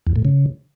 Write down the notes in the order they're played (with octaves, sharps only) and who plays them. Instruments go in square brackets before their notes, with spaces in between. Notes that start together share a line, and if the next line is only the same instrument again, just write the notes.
[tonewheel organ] E2
A2
C#3